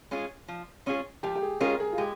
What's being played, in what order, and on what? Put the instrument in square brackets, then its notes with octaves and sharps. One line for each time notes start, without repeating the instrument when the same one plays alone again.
[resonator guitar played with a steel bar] G#3 C#4 F4 G#4
F3
G#3 C#4 F4 G#4
[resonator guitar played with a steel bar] F3 [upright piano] G4
[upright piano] G4
G#4
[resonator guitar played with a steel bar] G#3 C#4 F4 G#4 [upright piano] A#4
[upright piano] G#4
F4
[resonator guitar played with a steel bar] G#3 [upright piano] G4